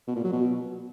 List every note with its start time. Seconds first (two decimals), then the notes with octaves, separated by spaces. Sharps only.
0.08 B2
0.16 A#2
0.24 F#3
0.33 B2